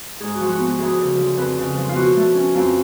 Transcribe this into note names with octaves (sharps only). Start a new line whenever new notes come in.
G#2 G#4
F3 F#4
F#4
B3
F#4
D2 G#4
C#3
F3
F2 B4
C#3
F3
F4
B2 F#4
A3
C#4
F2 F4